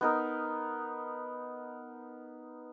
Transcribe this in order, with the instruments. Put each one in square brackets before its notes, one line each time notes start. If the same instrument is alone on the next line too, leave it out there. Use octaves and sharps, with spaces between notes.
[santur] B3 D#4 A#4